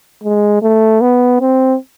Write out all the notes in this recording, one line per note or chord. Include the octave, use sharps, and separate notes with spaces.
G#3
A3
B3
C4